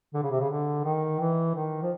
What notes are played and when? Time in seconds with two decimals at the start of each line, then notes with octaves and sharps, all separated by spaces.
0.14 D3
0.23 C#3
0.31 C3
0.40 C#3
0.49 D3
0.84 D#3
1.19 E3
1.55 D#3
1.82 F3